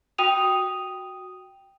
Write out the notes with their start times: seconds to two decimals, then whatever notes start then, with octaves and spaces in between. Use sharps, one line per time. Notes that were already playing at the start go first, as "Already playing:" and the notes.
0.18 F#4 G5 D#6 D#7 F7